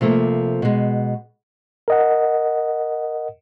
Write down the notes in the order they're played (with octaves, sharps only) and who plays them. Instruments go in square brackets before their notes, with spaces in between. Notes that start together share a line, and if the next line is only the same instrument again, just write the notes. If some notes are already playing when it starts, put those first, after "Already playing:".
[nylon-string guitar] C3 F3 A3 A#3
B2 G#3
[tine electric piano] A#4 D#5 F#5